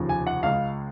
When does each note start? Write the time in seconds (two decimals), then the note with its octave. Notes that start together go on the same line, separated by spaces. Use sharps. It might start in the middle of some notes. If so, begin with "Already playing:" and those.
Already playing: F1 D#2 C#3 F3
0.09 G#5
0.27 F#5
0.43 C#2 C#3 G#3 F5